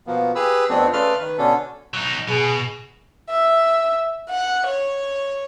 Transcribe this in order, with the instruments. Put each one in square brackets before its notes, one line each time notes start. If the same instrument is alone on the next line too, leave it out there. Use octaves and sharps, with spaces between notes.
[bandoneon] B2 F3 A#3 B3
G4 G#4 B4 B5 E6
F2 A3 B3 C4 D4
C#3 A3 B4 D5 C6 F6
D#3 B4
B2 D3 C#4 D4 A4
[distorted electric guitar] F#3 D#4
[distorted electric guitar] B2 [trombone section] G#4
[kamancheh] E5
F#5
C#5